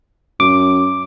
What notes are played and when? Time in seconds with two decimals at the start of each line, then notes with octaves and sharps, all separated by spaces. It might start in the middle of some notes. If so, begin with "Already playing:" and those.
0.40 F#2 D6